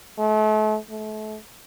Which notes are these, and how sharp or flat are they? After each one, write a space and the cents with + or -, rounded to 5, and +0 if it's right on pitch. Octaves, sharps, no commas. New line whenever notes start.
A3 -40
A3 -35